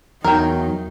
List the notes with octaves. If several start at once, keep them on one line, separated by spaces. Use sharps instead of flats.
E2 F#3 D#4 A#4 G5